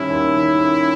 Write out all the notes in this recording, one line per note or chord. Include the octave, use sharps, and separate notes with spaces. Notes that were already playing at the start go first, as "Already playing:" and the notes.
Already playing: D#3 G3 C#4 E4
D#2
D#3
C#4